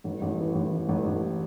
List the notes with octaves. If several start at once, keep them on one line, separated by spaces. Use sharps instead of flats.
A1
A1
E3
A1
E3
A1
A1